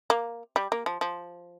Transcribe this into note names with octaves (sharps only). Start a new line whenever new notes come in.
A#3
G3
A#3
F3
F3